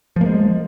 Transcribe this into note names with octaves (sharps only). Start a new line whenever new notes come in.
F3 G#3 A#3